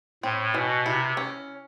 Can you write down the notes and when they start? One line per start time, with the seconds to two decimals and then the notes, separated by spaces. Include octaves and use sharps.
0.23 A2 C4
0.54 B2 E3
0.86 C3 E4
1.17 C#4